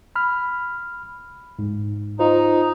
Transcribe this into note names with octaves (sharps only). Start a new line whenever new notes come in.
B5 F6
G#2
D#4 F4 C5